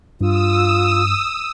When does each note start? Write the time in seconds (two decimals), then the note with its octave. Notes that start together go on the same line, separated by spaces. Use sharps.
0.21 G2 F4 D#6 E6